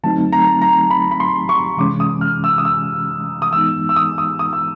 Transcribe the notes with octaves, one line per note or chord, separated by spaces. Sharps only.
D3 F#3 A3 C4 D#4 A5
A#5
A#5
B5
B5
C6
C#6
C3 E3 G#3 C#4 D6
D#6
F6
E6
D#6
E6
D#6
E3 G#3 B3 D#4 E6
E6
D#6
D#6
D#6
E6